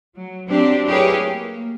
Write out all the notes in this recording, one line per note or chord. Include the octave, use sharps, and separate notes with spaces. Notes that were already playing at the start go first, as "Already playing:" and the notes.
F#3
F#3 C4 D4 G4
E4 G4 G#4 A#4 B4 C#5
A#3